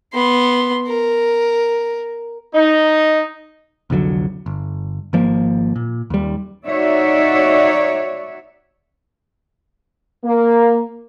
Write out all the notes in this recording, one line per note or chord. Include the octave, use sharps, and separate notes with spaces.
B3 C6
A#4
D#4
C2 F2 D3 F#3
G1
G#1 F3 A#3
A#2
D#2 G3
D#4 F#4 C#5 D5 E5
A#3